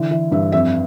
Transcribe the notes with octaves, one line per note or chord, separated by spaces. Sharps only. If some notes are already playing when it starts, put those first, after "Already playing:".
Already playing: D3 E3
E3
G2 E5
F2 E5